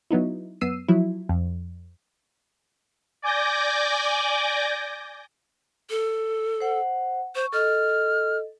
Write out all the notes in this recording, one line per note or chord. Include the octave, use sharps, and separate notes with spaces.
F#3 B3 D#4 E4
F#2 B3 E6 C7 D#7
F3 F#3 E4
F2
D5 G#5 D6 G6 A#6
A4
C5 F#5
C5 C#6
A4 D#5 F6